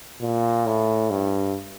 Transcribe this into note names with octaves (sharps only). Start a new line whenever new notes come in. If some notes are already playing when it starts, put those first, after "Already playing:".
A#2
A2
G2